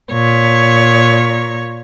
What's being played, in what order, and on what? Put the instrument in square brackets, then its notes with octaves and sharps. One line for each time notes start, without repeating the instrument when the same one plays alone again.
[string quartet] A#2 C#5